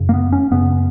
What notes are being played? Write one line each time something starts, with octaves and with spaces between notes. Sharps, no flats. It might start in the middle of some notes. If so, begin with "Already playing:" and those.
Already playing: F#2 C#3
A#3
B3
C#4
F#2 C#3 B3